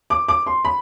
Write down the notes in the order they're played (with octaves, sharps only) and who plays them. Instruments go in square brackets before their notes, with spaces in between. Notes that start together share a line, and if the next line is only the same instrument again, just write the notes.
[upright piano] D6
D6
C6
B5